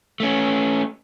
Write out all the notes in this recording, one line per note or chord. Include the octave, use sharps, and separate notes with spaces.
A3 C#4